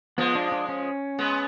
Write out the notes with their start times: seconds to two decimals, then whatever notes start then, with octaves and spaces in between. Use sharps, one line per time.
0.18 F3 G#3 B3
0.35 D4
0.52 D4
0.69 C#4
1.19 G#3 B3